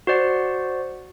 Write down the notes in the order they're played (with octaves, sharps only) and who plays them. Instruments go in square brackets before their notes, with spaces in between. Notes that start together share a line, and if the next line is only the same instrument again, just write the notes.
[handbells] F#4 C5 D5 F#5